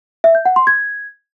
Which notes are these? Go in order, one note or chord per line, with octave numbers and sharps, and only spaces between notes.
E5
G6
F#5
C6
G#6